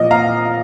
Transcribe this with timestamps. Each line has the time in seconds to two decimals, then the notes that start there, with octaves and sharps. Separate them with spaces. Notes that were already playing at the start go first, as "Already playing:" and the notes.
Already playing: A#2 F3 D#5
0.11 F5 A#5